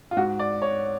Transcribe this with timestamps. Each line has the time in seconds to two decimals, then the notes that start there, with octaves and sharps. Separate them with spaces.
0.11 F4
0.17 G#2 F#4
0.39 D5
0.62 C#5